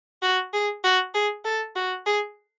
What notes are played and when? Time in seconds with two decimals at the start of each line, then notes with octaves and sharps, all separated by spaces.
0.23 F#4
0.53 G#4
0.84 F#4
1.15 G#4
1.45 A4
1.76 F#4
2.06 G#4